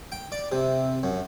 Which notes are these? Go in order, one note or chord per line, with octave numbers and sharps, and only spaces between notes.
G5
D5
C3
F#2